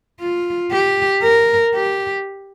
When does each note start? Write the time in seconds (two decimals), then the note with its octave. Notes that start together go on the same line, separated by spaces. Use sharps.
0.20 F4
0.71 G4
1.22 A#4
1.75 G4